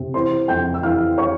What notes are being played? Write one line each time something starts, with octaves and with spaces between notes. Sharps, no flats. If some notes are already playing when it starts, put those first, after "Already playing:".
Already playing: C3
E3 C5 C6
F2 G5 G6
E6
E3 F5 F6
C#5 C#6